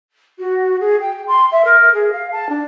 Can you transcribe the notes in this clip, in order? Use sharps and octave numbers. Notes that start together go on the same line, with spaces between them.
F#4
G#4
G5
C6
E5
A#4
G#4
F5
A5
D4